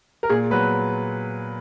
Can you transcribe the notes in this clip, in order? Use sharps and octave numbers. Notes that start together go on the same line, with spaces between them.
A#4
A#2 G#4
F#3 B3 B4